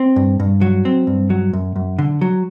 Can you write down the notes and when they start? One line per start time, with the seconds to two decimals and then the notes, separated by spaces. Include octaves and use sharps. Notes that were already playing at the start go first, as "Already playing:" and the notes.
Already playing: C4
0.16 G2
0.40 G2
0.61 F#3
0.85 C4
1.07 G2
1.30 F#3
1.53 F#2
1.76 F#2
1.99 D3
2.21 F#3